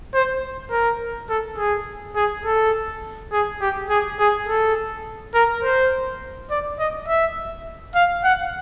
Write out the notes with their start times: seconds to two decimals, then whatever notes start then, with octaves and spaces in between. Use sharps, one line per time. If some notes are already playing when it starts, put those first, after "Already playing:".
0.14 C5
0.72 A#4
1.30 A4
1.58 G#4
2.16 G#4
2.46 A4
3.32 G#4
3.61 G4
3.90 G#4
4.20 G#4
4.48 A4
5.35 A#4
5.64 C5
6.51 D5
6.80 D#5
7.08 E5
7.95 F5
8.25 F#5